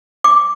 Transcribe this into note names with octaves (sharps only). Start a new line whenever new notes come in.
D6